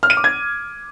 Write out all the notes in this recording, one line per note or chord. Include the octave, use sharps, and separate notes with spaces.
F6
D#7
D6
G#6